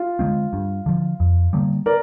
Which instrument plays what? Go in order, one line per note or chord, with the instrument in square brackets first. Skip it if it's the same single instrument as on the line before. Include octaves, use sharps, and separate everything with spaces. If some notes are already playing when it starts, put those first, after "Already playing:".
Already playing: [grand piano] F4
[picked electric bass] D3 G#3 C4
G2
D3 F3
F2
D3 G3 A#3
[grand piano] A#4 D5